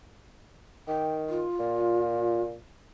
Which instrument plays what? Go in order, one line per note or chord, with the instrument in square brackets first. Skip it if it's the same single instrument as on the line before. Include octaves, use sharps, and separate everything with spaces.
[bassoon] D#3 [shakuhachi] G5
[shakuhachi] F4
[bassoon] A#2